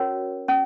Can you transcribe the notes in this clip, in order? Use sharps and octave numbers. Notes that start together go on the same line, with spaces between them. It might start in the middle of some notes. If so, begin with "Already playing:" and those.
Already playing: C#4 F#4 A#4 C#5
C#4